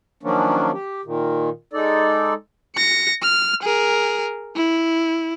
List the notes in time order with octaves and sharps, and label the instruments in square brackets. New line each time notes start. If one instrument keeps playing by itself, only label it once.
[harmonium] D#3 F3 F#3 A#3 C#4 D4
G4
A#2 D#3
G#3 D#4 A4 D5
[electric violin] A#6 C#7
F6
G#4 A#4
E4